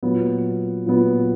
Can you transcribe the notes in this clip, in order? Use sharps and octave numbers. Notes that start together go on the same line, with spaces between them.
A#2 F#3 B3
A#2 F#3 B3